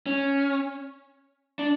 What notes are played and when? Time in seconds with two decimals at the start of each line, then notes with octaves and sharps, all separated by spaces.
0.06 C#4
1.59 D4